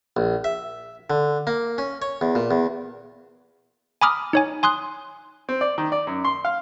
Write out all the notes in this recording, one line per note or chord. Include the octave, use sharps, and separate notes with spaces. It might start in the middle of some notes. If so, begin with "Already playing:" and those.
A#1
E5
D3
A#3
C#4
C#5
E2
A#2
E2
G#5 A#5 B5 D6 D#6 F6
D#4 C#5 G#5
G#5 C6 D#6 F#6
C4
D5
D#3
D5
F#2
C6
F5